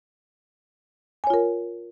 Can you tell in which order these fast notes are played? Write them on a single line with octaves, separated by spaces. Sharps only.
G#5 C#5 F4 A#4